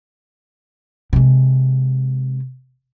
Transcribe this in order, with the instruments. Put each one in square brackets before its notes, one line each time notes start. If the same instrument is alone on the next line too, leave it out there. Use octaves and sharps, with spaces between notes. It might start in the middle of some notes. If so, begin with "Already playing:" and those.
[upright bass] C3 G#3